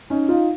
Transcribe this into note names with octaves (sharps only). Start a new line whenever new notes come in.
C#4 D#4
D#4 F4